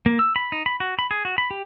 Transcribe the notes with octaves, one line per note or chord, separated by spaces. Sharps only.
A#3
E6
B5
D#4
B5
F#4
B5
G#4
F#4
B5
G4